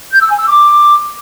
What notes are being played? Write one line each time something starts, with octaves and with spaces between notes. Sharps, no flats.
G6
E6
G#5
E6
D6